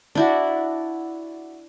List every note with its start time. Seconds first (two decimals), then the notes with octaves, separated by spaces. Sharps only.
0.15 D4 E4 F#4